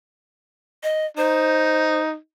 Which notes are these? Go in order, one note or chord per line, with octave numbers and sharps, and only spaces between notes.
D#5
D#4 C5